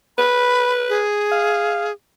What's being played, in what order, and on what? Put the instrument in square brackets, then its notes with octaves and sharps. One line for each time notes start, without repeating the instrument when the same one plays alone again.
[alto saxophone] B4 [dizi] B5
[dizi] G#4
[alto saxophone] F5